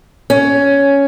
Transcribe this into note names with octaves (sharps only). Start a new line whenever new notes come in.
C#4